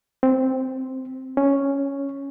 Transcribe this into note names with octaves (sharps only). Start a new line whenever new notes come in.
C4
C#4